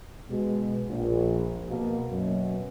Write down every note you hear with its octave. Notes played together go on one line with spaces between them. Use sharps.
B2 G#3
A#1
B2 A#3
F#2 B2